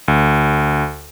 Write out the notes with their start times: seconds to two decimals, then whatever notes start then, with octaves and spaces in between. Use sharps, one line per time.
0.08 D2